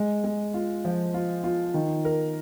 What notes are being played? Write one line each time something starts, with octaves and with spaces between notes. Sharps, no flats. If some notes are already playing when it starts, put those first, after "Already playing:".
Already playing: G#3
G#3
F4
F3
F4
F4
D#3
A#4